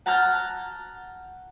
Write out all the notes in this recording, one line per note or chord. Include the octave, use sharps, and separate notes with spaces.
F#5 A5 A#5 F6 G6